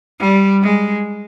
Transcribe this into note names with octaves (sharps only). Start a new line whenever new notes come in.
G3
G#3